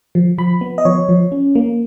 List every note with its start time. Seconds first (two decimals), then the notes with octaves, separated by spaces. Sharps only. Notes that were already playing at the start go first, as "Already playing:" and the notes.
0.15 F3
0.38 F3 B5
0.61 B3
0.78 D#5
0.85 F3 C#5
1.09 F3
1.32 C#4
1.55 A#3